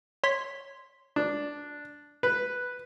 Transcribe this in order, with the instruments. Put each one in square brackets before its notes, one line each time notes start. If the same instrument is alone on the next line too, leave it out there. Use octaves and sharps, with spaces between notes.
[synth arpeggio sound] C#5 C6 B6
[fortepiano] D4
B4